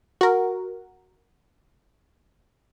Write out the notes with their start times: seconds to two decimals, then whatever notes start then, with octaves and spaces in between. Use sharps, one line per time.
0.21 F#4 A#4